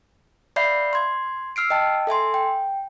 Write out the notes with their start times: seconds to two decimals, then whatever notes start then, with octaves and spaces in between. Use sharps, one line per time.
0.56 D5 E5 F5 B5 G6 C7
0.93 C6 G#6
1.56 E6 F6 C7 D7
1.70 D#5 G5 A5
2.07 A4 E5 G#5 C6
2.34 G5